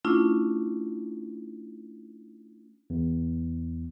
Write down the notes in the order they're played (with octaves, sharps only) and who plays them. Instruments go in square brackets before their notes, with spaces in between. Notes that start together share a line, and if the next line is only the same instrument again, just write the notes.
[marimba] A3 C#4 D4 E4 F4
[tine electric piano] E2